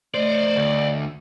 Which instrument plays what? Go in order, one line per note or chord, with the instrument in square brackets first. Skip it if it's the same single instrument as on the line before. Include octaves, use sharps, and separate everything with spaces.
[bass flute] A3 [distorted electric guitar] C5 [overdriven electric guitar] D5 D#5
[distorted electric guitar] D2